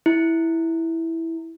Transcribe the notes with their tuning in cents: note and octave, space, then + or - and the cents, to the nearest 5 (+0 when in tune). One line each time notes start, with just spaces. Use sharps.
E4 -5